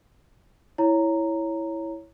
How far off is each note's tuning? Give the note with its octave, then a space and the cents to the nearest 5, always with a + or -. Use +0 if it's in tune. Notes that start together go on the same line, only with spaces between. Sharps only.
E4 +0 C#5 +0 A#5 -10